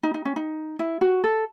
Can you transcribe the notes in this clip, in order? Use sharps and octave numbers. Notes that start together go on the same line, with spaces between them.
D#4
D#4
C#4
D#4
E4
F#4
A4